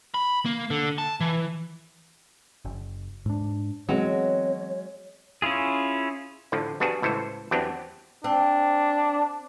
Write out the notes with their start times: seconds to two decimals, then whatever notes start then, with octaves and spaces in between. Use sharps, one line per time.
0.14 B5
0.46 A#3
0.70 D3
0.98 A5
1.20 E3
2.65 F#1
3.26 G#2 D4
3.89 E3 F#3 G#3 B3 C4 C#5
5.42 C#4 E4 F4 G#4
6.52 A2 D3 F3
6.80 G3 B3 D4 F#4 G#4
7.02 C#2 A2 E3 A4 C5
7.51 E2 F#3 B3 C4 D4 G4
8.24 C4 D4